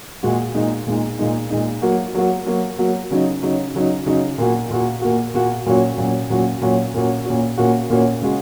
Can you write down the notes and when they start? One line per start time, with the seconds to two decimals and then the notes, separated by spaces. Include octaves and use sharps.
0.23 A#2 G#3 F#4
0.54 A#2 G#3 D#4
0.87 A#2 G#3 D#4
1.19 A#2 G#3 D#4
1.50 A#2 G#3 D#4
1.82 F#3 A#3 F#4
2.15 F#3 A#3 F#4
2.46 F#3 A#3 F#4
2.78 F#3 A#3 F#4
3.11 C#3 F#3 D#4
3.42 C#3 F#3 D#4
3.74 C#3 F#3 D#4
4.06 C#3 F#3 D#4
4.38 A#2 A#3 F#4
4.70 A#2 A#3 F#4
5.02 A#2 A#3 F#4
5.34 A#2 A#3 F#4
5.66 A#2 F#3 C#4 F#4
5.98 A#2 F#3 C#4 F#4
6.30 A#2 F#3 C#4 F#4
6.61 A#2 F#3 C#4 F#4
6.94 A#2 A#3 C#4 F#4
7.25 A#2 A#3 C#4 F#4
7.57 A#2 A#3 C#4 F#4
7.90 A#2 A#3 C#4 F#4
8.21 C#3 G#3 F#4